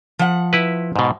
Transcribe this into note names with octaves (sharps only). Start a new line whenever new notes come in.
F3 F#5
E4 B4
G#2 B2